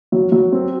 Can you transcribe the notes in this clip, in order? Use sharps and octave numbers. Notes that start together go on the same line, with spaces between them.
F#3
F#3
C4